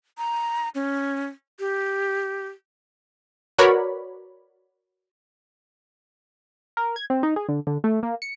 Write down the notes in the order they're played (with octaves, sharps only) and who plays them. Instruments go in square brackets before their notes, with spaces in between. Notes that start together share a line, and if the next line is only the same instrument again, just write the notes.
[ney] A#5
C#4
G4
[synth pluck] F#4 A#4 B4 C#5 D5 B5
[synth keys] A#4
G#6
C4
D#4
G#4
D3
D3
A3
A#3
C#7